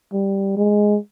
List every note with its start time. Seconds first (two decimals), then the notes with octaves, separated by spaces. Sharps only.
0.13 G3
0.57 G#3